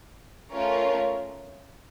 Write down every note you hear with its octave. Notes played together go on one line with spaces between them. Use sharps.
A3 C#4 F4 A#4 C#5